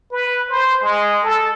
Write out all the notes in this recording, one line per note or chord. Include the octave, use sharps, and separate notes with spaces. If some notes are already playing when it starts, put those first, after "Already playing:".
B4
C5
G#3
A4